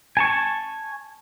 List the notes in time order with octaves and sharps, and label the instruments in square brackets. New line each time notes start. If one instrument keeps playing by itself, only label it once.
[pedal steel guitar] G#5 A5 C#6